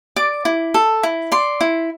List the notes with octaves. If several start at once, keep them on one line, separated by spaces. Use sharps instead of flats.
D5 D6
E4
A4
E4
D5 C6
E4